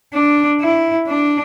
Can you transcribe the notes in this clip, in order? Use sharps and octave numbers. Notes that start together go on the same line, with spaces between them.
D4
E4
D4